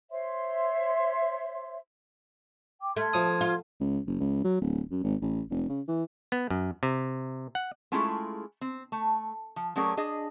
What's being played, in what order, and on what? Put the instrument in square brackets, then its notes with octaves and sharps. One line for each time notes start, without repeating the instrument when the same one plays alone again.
[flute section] C5 C#5 E5 C6
G5 D6
[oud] A3 [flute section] C6 F6 G#6
[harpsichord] F3 D#6
[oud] F4
[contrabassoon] C#2
F#1
C#2
F#3
D1
F#2
G#1
A1
F1
C#3
E3
[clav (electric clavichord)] B3
F#2
C3
F#5
[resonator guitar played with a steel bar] G#3 A3 C#4 E4 F4 G#4
C4
A3
F3
F#3 A3 C#4 G#4 A#4 D5
D4 G#4 D#5